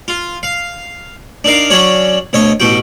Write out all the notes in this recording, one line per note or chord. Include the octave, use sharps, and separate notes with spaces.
F4
F5
D4 D#4 A#4 F5
F#3 C#4 D4 F#4 C#5
D2 B2 C#5 D#5
A1 B2 F#4 G5